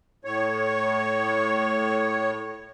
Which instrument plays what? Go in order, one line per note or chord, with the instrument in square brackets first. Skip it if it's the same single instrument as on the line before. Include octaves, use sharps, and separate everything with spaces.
[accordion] A2 C#5